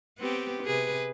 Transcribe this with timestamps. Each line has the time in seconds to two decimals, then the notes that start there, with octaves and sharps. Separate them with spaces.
0.19 B3 C4 G4
0.63 C3 G#4 B4